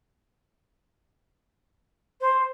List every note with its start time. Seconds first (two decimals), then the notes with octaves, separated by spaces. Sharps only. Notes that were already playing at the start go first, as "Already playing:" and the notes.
2.20 C5